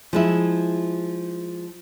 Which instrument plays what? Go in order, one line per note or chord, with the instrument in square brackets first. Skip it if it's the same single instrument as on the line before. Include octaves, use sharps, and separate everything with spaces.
[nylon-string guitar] F3 G#3 E4